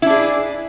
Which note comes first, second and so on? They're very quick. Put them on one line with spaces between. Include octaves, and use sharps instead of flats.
E4 D4 G#4